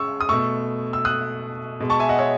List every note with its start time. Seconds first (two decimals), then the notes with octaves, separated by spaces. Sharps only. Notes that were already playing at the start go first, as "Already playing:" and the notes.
Already playing: C#3 G#3 C#6 E6
0.21 D#6
0.29 B2 A3 C#6 E6
0.93 E6
1.05 D#6 F#6
1.80 B2 G#3
1.90 A5 C#6
1.99 E5 G#5
2.09 D#5 F#5
2.18 C#5 E5